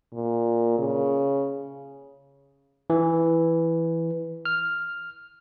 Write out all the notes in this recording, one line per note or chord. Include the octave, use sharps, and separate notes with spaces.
A#2
C#3
E3
F6